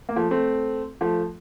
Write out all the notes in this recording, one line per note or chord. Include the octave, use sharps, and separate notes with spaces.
A#3
F3 A3
A3 C4
F3 A3